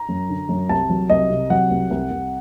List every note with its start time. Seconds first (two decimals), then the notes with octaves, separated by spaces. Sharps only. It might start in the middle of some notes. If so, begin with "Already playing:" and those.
Already playing: A#5
0.09 F#2
0.29 D3
0.49 F#2
0.69 C2 A5
0.90 F#3
1.10 C2 D#5
1.30 C3
1.50 F#3 F#5
1.70 C2
1.91 C2
2.11 C2